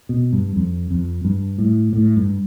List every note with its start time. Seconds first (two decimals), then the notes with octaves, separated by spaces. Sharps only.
0.09 B2
0.33 G2
0.56 F2
0.91 F2
1.24 G2
1.58 A2
1.93 A2
2.17 G2